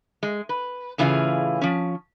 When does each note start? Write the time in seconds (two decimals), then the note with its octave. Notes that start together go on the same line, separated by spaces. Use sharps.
0.23 G#3
0.49 B4
0.98 A2 C#3 E3 F4 G#4 F5
1.61 F3 C#4